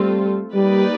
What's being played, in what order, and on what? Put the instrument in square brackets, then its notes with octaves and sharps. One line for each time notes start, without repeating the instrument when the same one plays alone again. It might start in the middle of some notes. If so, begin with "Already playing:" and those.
Already playing: [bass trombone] G3 [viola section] A3 C4 F4 A4
[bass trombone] G3 [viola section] A#3 D#4 G4 B4 D5